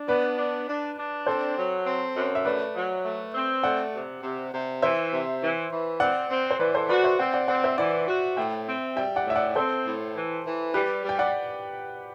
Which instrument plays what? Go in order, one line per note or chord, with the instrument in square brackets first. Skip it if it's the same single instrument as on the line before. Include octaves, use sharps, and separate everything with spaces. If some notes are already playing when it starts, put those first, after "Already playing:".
Already playing: [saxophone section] D4
[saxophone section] B3 [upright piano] B4 D5
[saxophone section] D4
D4
D4
[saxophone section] C4 [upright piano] A4 C5
[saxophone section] F#3
C4
F#2
[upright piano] E5
[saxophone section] A3 [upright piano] B4 D5
[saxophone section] F#3
A3
C4
[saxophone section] A3 [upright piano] D5 F#5
[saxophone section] C3
C3
C3
[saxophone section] E3 [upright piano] C5 E5
[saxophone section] C3
E3
E3
[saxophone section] C4 [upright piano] D5 F#5
[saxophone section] C4
[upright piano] C5
[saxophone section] E3 [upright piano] B4 D5
[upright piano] A4 C5
[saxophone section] F#4 [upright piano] B4 D5
[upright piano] C5 E5
[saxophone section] C4 [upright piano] D5 F#5
[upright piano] D5 F#5
[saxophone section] C4 [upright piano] D5 F#5
[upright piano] C5 E5
[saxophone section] E3 [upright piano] D5 F#5
[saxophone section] F#4
[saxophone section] A2 [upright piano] E5 G5
[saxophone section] C4
[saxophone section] G3 [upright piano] E5 G5
[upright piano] D5 F#5
[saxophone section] A2 [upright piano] E5
[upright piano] D5 F#5
[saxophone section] C4 [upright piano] A4 C5
[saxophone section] A2
E3
E3
[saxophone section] G3 [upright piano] G4 B4
[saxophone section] G3
[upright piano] G5
D5 F#5